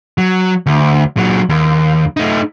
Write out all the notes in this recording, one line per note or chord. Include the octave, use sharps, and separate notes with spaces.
F#3
D2
A#2 F#3
D#2
A3 D#4